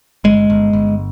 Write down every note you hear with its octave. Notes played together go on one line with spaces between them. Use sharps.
G1 G#3
G1
G1